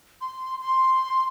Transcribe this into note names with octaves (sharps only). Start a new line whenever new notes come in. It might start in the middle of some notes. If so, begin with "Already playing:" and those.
C6
C6